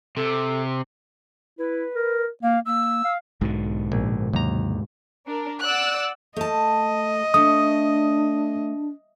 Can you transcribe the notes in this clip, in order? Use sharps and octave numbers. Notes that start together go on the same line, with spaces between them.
C3 A4
E4 B4
A#4
A#3 F5
A#3 E6
F5
B1 G#2 B2 D3
A#1
D#2 C3 F#3 A#5
D4 A#4
D5 F#5 E6 F#6
A3 D#5 A5
A3 D4 D#6